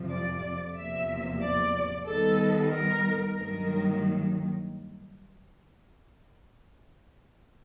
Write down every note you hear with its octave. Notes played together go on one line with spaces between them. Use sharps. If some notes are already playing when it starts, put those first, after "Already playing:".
Already playing: F2 C3 F3
D5
E2 C3 F3 A#3 E5
D5
D#3 G3 B3 D#4 A4
A#4
G2 D#3 F#3 A#3 A#4